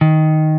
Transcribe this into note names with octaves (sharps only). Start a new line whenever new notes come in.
D#3